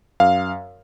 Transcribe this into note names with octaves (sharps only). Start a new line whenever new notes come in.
F#2 F5